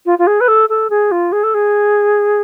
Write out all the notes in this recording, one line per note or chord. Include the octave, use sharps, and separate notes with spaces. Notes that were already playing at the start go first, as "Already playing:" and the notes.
F4
F4
G#4
B4
A4
A4
G#4
F4
G#4
A4
G#4